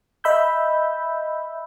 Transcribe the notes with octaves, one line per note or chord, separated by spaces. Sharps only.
D#5 E5 B5 E6 G6